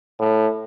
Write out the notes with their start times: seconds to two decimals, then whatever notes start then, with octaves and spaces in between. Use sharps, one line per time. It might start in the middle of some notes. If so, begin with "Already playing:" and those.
0.20 A2